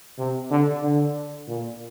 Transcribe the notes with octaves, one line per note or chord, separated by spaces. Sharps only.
C3
D3
D3
A#2